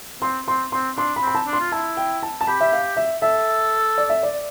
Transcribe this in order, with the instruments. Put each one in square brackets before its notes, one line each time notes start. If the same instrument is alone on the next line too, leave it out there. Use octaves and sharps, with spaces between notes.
[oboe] C4 [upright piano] C6
[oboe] C4 [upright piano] C6
[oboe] C4 [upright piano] C6
[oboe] D4 [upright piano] C6
[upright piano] B5
[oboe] C4
[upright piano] B5
A5
[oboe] D4
[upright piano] C6
[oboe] F4
[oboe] E4 [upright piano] A5
[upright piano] G5
A5
A5
[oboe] G4 [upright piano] B5
[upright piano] E5
F5
E5
[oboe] A4 [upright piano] E5
[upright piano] D5
E5
D5